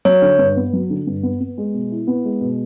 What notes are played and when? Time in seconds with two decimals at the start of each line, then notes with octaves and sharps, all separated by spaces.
0.05 F#3 C#5
0.22 D3
0.38 G2
0.56 B3
0.73 F#3
0.90 D3
1.07 G2
1.23 B3
1.40 B3
1.58 G#3
1.74 B2
1.91 E4
2.07 B3
2.24 G#3
2.41 B2